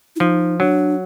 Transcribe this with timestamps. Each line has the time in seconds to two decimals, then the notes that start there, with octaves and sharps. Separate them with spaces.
0.16 E4
0.20 F3 D#4
0.60 F#3 D4